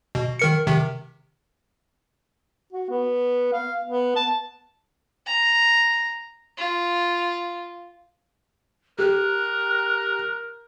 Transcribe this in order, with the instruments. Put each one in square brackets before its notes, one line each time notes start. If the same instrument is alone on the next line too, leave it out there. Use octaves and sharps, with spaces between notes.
[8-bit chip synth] B2
D#3 A#4 C#7
C3 D#3
[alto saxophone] F#4
B3
F5
B3
A5
[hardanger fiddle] A#5
F4
[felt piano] G4 [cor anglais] A#4 [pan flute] F#6